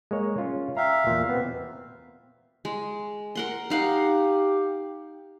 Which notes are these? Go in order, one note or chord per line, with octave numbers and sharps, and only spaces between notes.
G#3 A#3 C#5
C#4 F4
E5 F5 G5 A#5
E2 A#2
B2 B3 C4
G#3
A#4 F#5 C6
D#4 G4 F5 F#5